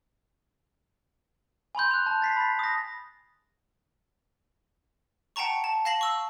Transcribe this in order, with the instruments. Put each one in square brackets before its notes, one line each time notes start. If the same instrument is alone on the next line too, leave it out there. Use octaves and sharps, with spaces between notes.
[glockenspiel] G#5 B5 C6 G6
F#6 F7
A5
A6 B6 C7
B5 A6
D#6 A#6
[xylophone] F#5 G5 A5 A#5 C#6
A5
F5 A5 A#6 C7 F#7
C#6 E6